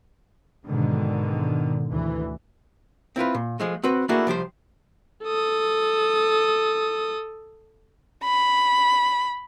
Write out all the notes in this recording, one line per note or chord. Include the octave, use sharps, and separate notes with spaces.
G#2 B2 D3 D#3
D2 E3
C4 E4 F4 B4
A#2
F3 G#3 A3
C4 F#4 B4
A3 A#3 D4 E4 F#4 G#4
C2 F3 G4 C5
A4 D#6
B5